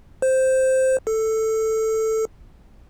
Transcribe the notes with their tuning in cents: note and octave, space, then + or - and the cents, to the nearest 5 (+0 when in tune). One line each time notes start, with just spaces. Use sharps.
C5 +0
A4 +5